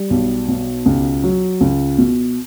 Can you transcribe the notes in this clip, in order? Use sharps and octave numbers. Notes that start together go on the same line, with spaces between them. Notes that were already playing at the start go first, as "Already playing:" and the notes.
Already playing: G3
B1
B2
C#2
F#3
C#2
B2